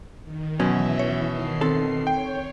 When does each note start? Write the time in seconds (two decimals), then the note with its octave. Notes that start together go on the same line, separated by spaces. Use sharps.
0.24 D#3
0.60 B2 E3 F#3 C#4 E5
0.99 C#5
1.30 D#3 C7
1.61 C4 A4
2.07 C#5 G5